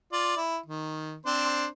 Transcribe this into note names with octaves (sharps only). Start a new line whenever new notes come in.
F4 D5
E4
D#3
C4 D4 C5